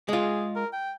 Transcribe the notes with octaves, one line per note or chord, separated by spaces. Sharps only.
G#3 F4 G#4
A#4
G5